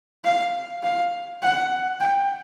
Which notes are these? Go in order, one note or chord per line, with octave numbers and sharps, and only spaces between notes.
F5
F5
F#5
G5